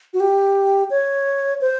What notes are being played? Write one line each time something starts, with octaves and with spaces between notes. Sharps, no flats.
F#4
G4
C#5
C5